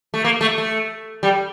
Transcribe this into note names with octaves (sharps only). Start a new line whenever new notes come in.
A3
A#3
A3
A3
G3